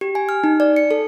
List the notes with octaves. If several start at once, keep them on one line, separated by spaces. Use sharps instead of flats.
G4
G#5
F6
D#4
D5
C#7
A4